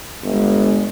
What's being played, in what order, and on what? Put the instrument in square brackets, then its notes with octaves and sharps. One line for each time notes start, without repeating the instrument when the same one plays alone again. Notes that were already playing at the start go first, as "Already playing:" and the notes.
[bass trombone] G1 [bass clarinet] G#3